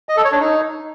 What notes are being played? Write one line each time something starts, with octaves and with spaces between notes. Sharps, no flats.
D#5
A4
C#5
D4
D#4